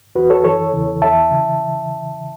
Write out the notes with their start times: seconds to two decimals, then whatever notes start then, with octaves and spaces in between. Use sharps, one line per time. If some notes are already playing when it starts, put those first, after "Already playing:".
0.15 E2 E3 F#4 B4
0.30 A4 C#5
0.44 F#2 E3 A4 C#5
0.73 E2 C#3 E3
1.02 E2 E3 E5 A5
1.32 C#3 E3